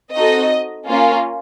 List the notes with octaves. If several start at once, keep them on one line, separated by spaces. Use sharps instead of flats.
C4 D#4 F#4 A4 D#5
A#3 C#4 F4